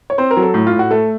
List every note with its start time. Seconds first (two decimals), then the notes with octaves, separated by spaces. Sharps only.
0.10 C#5
0.18 C4 C5
0.31 A#4
0.37 F#3
0.42 A4
0.54 A2
0.67 F4
0.73 A2
0.79 F#4
0.91 A3 A4